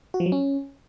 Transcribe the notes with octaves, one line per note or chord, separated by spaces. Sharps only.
F#4
F3
F#3
C#4